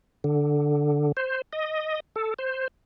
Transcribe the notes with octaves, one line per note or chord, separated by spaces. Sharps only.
D3
C5
D#5
A4
C5